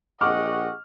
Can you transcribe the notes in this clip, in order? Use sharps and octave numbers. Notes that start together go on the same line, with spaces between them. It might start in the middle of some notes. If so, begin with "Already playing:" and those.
A#1 G4 G#4 D#5 F#5 C#6 D6 F6